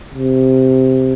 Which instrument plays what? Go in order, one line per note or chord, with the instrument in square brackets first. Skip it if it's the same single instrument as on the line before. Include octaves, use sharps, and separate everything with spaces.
[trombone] C3